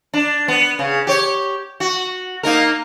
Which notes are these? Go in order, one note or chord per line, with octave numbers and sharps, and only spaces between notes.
D4
B3
C#3
G4 C#5
F#4
A#3 D#4 A#4